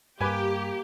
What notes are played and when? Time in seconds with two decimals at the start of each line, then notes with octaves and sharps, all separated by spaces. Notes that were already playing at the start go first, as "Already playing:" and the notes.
0.21 G2 A#3 G4 B4 G#5